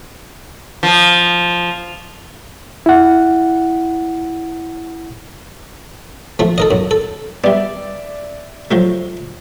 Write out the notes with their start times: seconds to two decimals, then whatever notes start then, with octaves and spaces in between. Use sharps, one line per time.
0.83 F3
2.86 E4 F#5
6.39 F3 A3
6.58 A4 A#4 D#5
6.71 F#2
6.91 A4
7.44 G3 B3 D5 E5
8.71 F3 F#3 A3